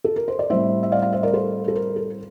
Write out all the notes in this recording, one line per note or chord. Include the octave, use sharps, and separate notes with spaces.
A4
A#4
C5
D5
A2 G3 C4 C5 E5
E5
D5 F5
D5 F5
C5 E5
A#4 D5
A4 C5
A4
A#4
A4